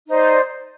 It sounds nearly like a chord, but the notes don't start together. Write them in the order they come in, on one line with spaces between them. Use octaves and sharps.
D#4 C5 D5